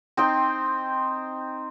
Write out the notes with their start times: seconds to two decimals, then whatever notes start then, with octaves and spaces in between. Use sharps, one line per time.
0.17 C4 D#4 G5